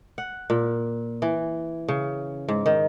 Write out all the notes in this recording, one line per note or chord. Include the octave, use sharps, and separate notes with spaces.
F#5
A#2
E3
C#3
G#2
D#3